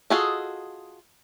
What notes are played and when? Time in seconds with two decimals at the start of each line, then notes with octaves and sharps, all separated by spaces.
0.10 F4 F#4 G#4 A4 D#5